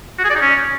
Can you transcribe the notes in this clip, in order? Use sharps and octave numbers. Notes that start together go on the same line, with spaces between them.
F#4
G#4
D5
D#4
C#4